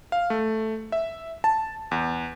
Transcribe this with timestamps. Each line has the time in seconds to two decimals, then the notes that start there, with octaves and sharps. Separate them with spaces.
0.12 F5
0.30 A3
0.92 E5
1.44 A5
1.91 E2